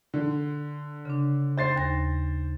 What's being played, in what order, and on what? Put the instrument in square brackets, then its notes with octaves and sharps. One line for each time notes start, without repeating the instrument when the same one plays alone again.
[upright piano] D3
[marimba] C#3 D4
[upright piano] C5 A6 C7
[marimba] D#2 A#6